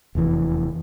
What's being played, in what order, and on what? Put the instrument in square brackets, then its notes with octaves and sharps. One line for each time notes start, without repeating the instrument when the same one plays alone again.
[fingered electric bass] F1 E2 E3